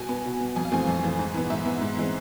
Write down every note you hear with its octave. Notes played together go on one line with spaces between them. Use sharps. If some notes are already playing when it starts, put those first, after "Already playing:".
Already playing: B2 G#5
B3
B2
B3
F2 G#5
F5
E3 A3 C4 G#5
F2
E3 A3 C4
G#2
E3 B3
G#2 E5
E3 B3
G#2
E3 G#3 C4